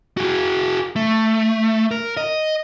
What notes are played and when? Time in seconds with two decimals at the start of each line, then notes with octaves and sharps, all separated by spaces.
0.17 F#4 G#4
0.96 A3
1.91 A#4
2.17 D#5